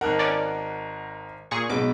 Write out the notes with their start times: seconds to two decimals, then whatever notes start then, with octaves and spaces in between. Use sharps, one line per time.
0.01 G#1 D#4 A#4 F#5 A5 F#6
0.19 C#4 D5
1.51 A#2 G#4 C#6
1.70 B1 B2 G#3 B3 D6